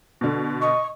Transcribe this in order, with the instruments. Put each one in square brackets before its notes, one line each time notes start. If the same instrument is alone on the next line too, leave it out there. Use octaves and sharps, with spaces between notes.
[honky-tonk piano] B2 D3
[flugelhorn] D#5 [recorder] C#6